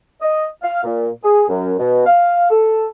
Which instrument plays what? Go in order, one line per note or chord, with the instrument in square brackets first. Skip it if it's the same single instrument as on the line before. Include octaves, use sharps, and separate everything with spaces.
[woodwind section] D#5
F5
A#2
G#4
F#2
B2
F5
A4